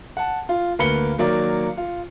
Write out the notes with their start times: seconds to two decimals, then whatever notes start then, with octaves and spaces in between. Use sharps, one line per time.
0.17 F#5 A5
0.49 F4
0.79 D2 A#3 B4 C#7 G7
1.18 D#3 F#3 A#3 D5
1.77 F4